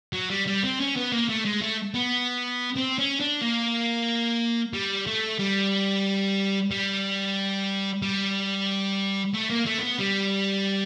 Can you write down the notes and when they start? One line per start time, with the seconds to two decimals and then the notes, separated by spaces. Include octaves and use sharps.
0.13 F#3
0.30 G3
0.47 G3
0.64 C4
0.80 C#4
0.96 B3
1.12 A#3
1.29 A3
1.45 G#3
1.62 A3
1.95 B3
2.77 C4
2.98 C#4
3.20 D4
3.42 A#3
4.74 G3
5.07 A3
5.39 G3
6.71 G3
8.02 G3
9.34 A3
9.51 A#3
9.66 A3
9.79 C4
9.83 B3
10.00 G3